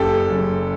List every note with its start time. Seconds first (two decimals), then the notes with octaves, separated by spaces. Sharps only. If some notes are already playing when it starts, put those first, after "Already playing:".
Already playing: F#1 G4 A4
0.29 F#2 C#3